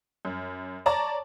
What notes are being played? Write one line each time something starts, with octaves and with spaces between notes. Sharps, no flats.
F#2
C#5 D5 A5 A#5